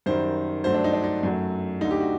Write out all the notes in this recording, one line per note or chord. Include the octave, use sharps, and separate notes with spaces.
F#2 D#3 G3 C5
G2 F#3 A3 C5
D4
D#4
D4
D#4
F#2 F#3 A3
D2 D3 A3 D#4
G4
F#4